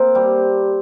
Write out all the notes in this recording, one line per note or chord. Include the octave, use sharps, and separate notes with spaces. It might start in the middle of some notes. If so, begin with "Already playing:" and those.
Already playing: A#3 C4
G3